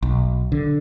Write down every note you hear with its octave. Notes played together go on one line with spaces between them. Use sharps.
B1
D3